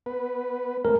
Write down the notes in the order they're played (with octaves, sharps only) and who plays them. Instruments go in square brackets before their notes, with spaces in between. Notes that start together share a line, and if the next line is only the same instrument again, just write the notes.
[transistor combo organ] B3 B4
[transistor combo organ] G#3 A3 C4 [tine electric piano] A#4